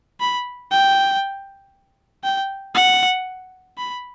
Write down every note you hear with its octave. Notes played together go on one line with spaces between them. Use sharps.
B5
G5
G5
F#5
B5